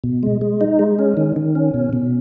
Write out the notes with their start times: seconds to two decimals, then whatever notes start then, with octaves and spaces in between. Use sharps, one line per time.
0.04 B2
0.23 G#3
0.41 G#3
0.61 D#4
0.79 G#3
0.99 C#4
1.17 D#3
1.36 D#3
1.55 C#4
1.74 B2
1.93 B2